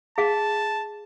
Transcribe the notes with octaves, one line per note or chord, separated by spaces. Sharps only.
G#4 F5 A5